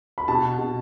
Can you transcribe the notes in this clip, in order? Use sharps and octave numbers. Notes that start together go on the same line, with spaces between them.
B5
B2 A5
B2